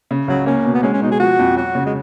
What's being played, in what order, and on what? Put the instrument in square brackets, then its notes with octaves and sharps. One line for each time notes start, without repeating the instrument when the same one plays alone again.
[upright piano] C#3
[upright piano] C#2 [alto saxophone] F#3
[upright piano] A#3 [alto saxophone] C#4
[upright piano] B2
[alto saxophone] B3
[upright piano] G#3 [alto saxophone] C#4
[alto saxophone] C#4
[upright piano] B2 [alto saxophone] D#4
[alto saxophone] G#4
[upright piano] F3 [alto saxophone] F#4
[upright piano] F2
[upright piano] F#3 [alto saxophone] F#4
[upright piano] C#3
[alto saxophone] G#3